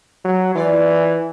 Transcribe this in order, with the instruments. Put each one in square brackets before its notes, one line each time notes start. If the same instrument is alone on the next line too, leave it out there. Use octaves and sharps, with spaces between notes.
[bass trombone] F#3
[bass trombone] E3 [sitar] F4 D5